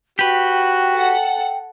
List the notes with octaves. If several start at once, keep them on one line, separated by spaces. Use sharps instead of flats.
F#4 G4 B4 G5
A4 F#5